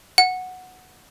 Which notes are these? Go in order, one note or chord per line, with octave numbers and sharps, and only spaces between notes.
F#5